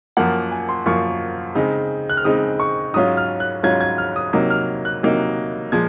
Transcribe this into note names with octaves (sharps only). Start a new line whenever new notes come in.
F#2 F3 A#3 F4 F#5
G#5
C6
F#2 F3 A#3 F4 C#6
C#3 G#3 C4 D#4
F#6
F6
C#3 G#3 C4 D#4 D#6
C#6
G#2 F#3 C#4 F4 D#6
F6
F#6
G#2 F#3 C#4 F4 G#6
G#6
F6
D#6
C3 F#3 A#3 D#4
F6
F#6
C3 F#3 A#3 D#4
A#2 F3 G#3 G#6